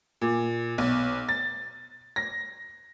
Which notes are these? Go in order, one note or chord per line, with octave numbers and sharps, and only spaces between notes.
A#2
B1
A6
A#6